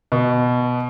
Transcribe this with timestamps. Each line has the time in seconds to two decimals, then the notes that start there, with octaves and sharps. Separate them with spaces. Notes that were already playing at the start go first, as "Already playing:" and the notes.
0.12 B2